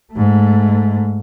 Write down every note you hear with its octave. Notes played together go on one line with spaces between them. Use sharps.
G#2 A3